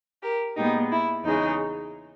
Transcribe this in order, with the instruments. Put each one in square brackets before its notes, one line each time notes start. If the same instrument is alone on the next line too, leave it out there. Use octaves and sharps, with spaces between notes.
[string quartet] G4 A#4
A#2 G#3 B3 D#4 G4
E4
E2 C#3 G#3 D#4